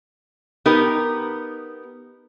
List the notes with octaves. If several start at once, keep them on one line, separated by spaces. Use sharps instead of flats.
B3 D#4 G4 A#4